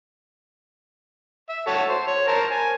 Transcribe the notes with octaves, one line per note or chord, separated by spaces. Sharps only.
E5
F#4 A4 C#5
C5
C#5
A#4 C5 A5
G#5